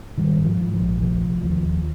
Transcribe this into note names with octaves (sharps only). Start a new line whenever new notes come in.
G#2 D#3 G3
G#2
F3
G#2
F3
A#1
F1 F3
F1
D#2 F3
D#2